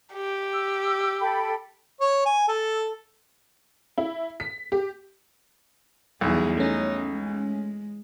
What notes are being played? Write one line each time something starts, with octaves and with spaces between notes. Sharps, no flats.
G4
E6
A4 G5 B5
C#5
G#5
A4
E4
B6
G4
B1 E2 G3 G#4
A3 C#4 D#4
G#3